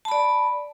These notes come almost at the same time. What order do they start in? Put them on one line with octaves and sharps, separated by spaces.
A5 B5 D5